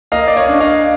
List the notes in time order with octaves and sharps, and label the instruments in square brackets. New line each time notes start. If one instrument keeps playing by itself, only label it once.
[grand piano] A#3 D#5 F5
D5
C#5 D#5
D4
D#5 F5